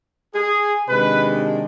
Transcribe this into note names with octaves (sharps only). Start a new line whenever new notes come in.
G#4
C3 D#3 G#3 D4 B4